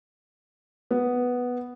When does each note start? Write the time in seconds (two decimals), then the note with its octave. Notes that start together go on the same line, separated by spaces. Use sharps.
0.91 B3